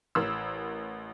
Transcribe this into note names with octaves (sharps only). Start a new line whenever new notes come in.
A1 A#4 B5 E6